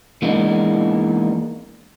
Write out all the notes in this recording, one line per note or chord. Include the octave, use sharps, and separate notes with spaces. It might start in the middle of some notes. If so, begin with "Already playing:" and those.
E3 G#3 A#3 B3 D4 D#4